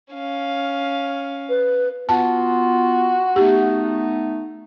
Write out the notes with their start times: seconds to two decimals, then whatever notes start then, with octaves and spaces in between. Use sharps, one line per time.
0.13 C#4 F5
1.49 B4
2.09 B3 F4 F#4 A5
3.36 A3 B3 D#4 G4